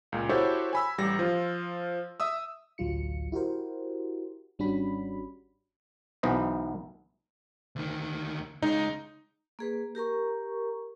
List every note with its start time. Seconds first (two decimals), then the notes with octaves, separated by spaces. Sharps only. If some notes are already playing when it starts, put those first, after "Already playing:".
0.12 C#2 A#2
0.29 E4 F#4 G4 A4 C5 C#5
0.73 G#5 B5 E6
0.98 A1 G3 A#6
1.19 F3 F4
2.20 E5 D#6 E6
2.78 A1 D2 F#3 F4 C#7
3.32 E4 F#4 G4 A#4 C5
4.59 G#1 G3 C#4 D4 F#4 B5
6.23 B1 E3 B3 C5 D#5
7.76 D2 D#3
8.62 C#2 G#3 D#4
9.59 A#3 G#4 B4
9.95 G4 A#4 A#5 C#6